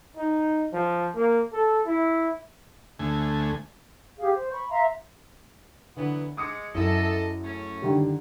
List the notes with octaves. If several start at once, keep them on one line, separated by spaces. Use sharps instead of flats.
D#4
F3
A#3
A4
E4
D2 A3 G#5
G4 G#4 F5
C5
B5 C#6
E5 F5 A#5 C6
D3 E3 F#3 B3
G#3 D6 D#6 C#7
F#2 E4 G#4 A4 D#5
A3 C#4
D3 D#3 G3